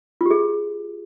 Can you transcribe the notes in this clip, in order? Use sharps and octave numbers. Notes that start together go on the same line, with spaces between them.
F4 G4 G#4